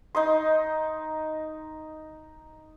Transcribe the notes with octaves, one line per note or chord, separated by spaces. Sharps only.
D#4 D#5 C6